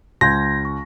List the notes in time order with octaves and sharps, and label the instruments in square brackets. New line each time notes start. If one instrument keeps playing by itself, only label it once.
[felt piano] C#2 [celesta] C6 G6 G#6 [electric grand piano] A#6
[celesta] C#6